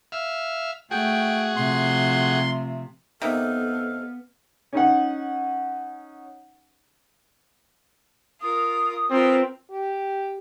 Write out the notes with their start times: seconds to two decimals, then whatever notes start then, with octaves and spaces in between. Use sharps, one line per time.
0.12 E5 F5
0.91 A3 F#4 G#4 G5
1.56 C3 F3 A3 C6
3.22 C3 A#3 B3 D#4 A4 F5
4.73 C#4 D#4 F#5
8.41 F4 A#4 D#6
9.10 C4 F4 A#4 B4
9.70 G4